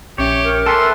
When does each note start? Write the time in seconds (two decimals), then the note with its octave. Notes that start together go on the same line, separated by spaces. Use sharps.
0.18 A#1 C#4 G4 C#5 E5
0.44 A#4
0.66 A4 B4 E5 G5 G#5 C6 D6